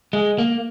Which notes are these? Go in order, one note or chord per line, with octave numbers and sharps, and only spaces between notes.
G#3
A#3